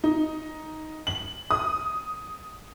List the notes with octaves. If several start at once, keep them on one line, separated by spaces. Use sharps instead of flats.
D#4
F#7
D#6